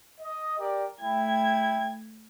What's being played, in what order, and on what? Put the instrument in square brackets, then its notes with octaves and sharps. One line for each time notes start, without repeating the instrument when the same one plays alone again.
[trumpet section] D#5
G4 A#4 D5
[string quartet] A3 G#6 [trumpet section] E4 G5